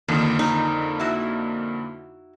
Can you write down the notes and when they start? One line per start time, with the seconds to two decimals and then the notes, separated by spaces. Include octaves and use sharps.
0.08 F2 D3 D#3 F3 A#3
0.39 D#4
0.99 E4 F#4